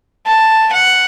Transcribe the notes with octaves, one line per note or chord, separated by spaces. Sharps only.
A5
F#5